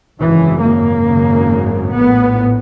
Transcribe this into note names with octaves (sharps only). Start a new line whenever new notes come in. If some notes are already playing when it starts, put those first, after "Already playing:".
G#1 F#2 C#3 E3
A#3
G#1 F#2 C#3
A#1 A2 B3